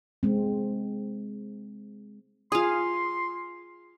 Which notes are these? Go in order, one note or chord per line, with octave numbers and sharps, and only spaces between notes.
G#3 C4
F4 G#4 F5 C6 D#6